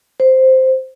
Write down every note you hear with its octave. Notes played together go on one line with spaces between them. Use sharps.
C5